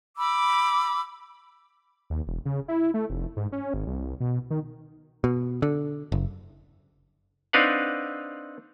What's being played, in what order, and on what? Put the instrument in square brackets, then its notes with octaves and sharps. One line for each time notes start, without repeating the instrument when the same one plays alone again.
[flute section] B5 D6 E6
[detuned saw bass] D#2
E1
C#3
E4
A3
F1
G#2
C#4
G#1
C2
B2
D#3
[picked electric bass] B2
D3
F#1
[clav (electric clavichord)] C4 D4 D#4 B4 F5 F#5